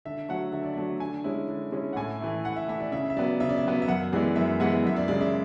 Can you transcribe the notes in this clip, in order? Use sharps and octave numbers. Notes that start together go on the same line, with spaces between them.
D3 E5
F#3 A3 F#5
D3 E5
D5
F#3 A3 E5
D3 G#5
G#3 C#4 E4
D3
G#3 C#4 E4
F#5
A2 G#5
E3 A3 E4
A2 F#5
E5
E3 A3 E4 E5
D5
C#3 E5
E5
F#3 B3 D5
C#3 E5
D5
E5
F#3 B3
E5
F#2 F#5
E3 G#3 B3 E4 D5
F#2 E5
E3 G#3 B3 E4 F#5
F#2 E5
D5
C#3 G#3 D5
E5